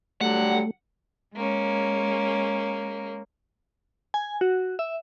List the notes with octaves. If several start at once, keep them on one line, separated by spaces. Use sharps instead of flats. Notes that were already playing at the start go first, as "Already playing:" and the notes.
D3 F#3 G3 A3 F#5
G#3 A#3 C#4
G#5
F#4
E5